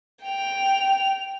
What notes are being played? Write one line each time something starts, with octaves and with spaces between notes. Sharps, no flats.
G5 F7